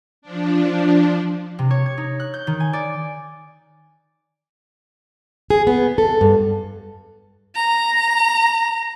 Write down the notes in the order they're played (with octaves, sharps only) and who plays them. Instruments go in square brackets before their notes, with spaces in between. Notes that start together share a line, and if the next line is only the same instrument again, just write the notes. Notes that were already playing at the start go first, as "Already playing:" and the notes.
[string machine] F3 D4
[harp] C3
C#5
G#6
D#4
F#6
G6
D#3
G#5
D5
[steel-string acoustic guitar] G#4
B3
A4
G2
[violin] A#5